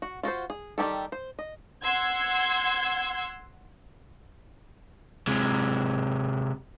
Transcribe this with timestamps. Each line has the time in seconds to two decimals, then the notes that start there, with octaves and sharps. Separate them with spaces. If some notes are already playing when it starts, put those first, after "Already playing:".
0.02 F#4
0.23 F4 F#4 A4 C5
0.50 G#4
0.78 D#3 G3 A#3 G4 A4
1.12 C5
1.39 D#5
1.82 F#5 C6 E6 G#6
5.27 C3 G#3